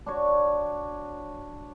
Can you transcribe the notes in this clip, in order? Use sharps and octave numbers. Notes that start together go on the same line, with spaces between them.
D4 F#4 C#5